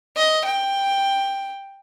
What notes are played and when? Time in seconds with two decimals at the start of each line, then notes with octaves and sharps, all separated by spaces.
0.16 D#5
0.45 G5